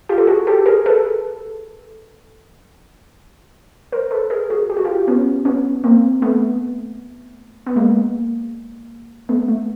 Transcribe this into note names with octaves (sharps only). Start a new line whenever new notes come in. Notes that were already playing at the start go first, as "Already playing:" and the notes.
F4 G4
A4
F#4 G#4
G4 A4
G#4 A#4
A4 B4
A#4 C5
A4 B4
G#4 A#4
F#4 G#4
G4
F#4
F4 G4
B3 C#4
B3 C#4
A#3 C4
A3 B3
B3
G#3 A#3
A3 B3
A3